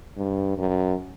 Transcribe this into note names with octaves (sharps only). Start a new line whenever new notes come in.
G2
F#2